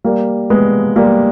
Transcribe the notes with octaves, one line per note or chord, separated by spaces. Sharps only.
G3 A#3
G#3 B3
G3 A#3